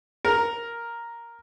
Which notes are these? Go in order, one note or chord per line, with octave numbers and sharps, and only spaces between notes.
A#4